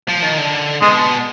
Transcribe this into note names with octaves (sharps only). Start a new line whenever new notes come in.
F3
D#3
D3
B2 G#3